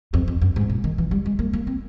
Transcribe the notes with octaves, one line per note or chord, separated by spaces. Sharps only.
F2
F2
F#2
G#2
A#2
D#3
E3
G3
G#3
A#3
A#3
C4